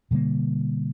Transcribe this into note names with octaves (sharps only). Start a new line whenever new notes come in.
B2 D3 G3 A#3